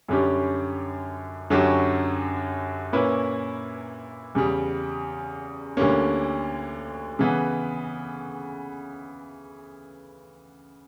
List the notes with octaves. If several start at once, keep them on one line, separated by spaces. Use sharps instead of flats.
F#2 D3 G3 C#4 G4
F#2 D3 F#3 C#4 G4
A#2 A#3 C#4 E4 B4
E2 C#3 G3
D2 D3 G3 A#3 C#4
C#3 E3 B3